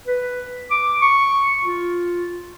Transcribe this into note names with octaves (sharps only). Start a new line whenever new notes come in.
B4
D6
C#6
F4